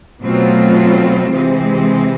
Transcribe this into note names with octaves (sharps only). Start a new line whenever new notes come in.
B2 F#3 A3 C4 F4
C3 E3 G#3 C4